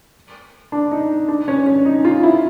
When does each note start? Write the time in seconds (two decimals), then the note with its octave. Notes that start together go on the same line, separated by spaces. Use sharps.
0.72 D4
0.91 D#4
1.28 D4
1.48 C#4
1.66 C#4
1.85 D#4
2.05 F4
2.23 E4